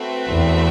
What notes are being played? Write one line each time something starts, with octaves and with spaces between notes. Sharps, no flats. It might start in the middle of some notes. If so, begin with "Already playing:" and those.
Already playing: A3 C4 F#4 B4 E5
E2